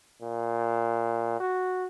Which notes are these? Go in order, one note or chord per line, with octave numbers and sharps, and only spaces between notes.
A#2
F#4